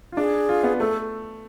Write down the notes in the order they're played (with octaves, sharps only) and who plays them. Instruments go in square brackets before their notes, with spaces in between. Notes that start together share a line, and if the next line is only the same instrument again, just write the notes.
[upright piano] F4
[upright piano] D4 [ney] G#4
[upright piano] F4
B3
[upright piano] A3 [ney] A4